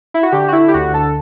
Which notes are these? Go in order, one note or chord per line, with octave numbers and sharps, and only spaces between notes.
E4
F#4
D3 G4
F#4
E4
G4
D2 F#4
A4